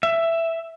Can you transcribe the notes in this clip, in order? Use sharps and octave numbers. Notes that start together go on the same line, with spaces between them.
E5